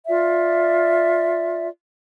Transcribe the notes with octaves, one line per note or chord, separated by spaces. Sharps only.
F4 D5 E5